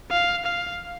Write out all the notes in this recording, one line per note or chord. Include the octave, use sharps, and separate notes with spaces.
F5
F5